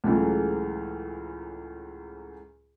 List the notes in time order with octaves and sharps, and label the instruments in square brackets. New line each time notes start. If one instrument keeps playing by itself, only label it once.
[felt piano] C#2 A2 C#3 E3 F#3 A3